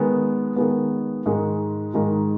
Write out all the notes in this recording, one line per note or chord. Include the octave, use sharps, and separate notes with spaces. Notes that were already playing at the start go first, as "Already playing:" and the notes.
Already playing: D#3 G#3 B3
D#3 G#3 B3
G#2 D#3 G#3
G#2 D#3 G#3